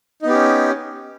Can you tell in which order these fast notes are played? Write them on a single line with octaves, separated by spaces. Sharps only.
D#4 B3 G4 C#4